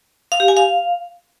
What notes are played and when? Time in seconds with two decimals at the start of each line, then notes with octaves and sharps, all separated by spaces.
0.32 F5
0.40 G4
0.48 G#5
0.57 F5